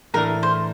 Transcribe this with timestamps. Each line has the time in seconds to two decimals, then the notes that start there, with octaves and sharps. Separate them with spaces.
0.14 A2 E3 A3 D4 A#4
0.43 C5